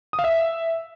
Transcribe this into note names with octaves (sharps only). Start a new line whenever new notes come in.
D#6
F5
E5